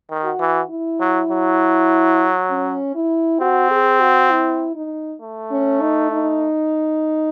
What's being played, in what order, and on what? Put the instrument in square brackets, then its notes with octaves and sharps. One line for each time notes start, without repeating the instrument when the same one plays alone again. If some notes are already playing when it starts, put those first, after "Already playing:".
[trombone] D#3
[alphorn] F#4
[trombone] E3
[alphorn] E4
[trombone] F#3
F#3
[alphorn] C#4
E4
[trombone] C4 [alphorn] F#4
[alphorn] G#4
F#4
E4
D#4
[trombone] A3
[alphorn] C#4
D#4
D#4